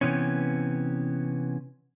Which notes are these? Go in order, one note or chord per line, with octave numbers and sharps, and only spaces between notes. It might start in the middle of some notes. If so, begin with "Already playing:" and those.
C3 E3 B3 C#4